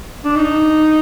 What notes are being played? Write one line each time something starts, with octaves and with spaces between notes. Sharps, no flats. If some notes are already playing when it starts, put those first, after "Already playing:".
D4
D#4